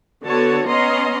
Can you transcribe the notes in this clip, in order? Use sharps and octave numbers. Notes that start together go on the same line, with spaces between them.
D3 B3 F#4 C#5 A5
B3 C#4 D#5 A#5 C6